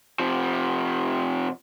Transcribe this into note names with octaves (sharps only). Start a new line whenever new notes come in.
C3 F3